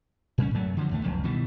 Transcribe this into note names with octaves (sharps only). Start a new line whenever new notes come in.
A#2 G3 C#4
F#2 F#3 A3
D3 F3 F#3
D#2 A2 A3
E1 C#2 F#2 F3
B2 D#3 E3 G3